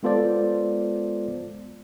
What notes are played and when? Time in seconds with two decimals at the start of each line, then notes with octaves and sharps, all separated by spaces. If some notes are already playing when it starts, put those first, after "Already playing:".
0.03 G#3 B3 F4 A4 C5 D5